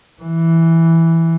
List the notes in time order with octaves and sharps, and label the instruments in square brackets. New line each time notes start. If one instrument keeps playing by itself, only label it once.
[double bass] E3